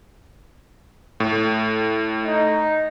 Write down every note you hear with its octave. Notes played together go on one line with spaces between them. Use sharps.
A2
D#4